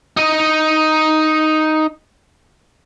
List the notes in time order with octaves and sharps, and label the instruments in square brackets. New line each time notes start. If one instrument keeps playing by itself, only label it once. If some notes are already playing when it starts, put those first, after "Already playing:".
[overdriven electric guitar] D#4 D#5